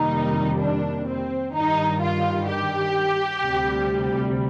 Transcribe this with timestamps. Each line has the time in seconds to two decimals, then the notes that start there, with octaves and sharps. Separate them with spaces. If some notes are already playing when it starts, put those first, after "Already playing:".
Already playing: F2 C3 D#3 G3 A#3 D#4
0.60 D4
1.07 C4
1.54 G2 D#3 G3 D#4
2.01 F4
2.48 G4
3.44 D2 C3 G3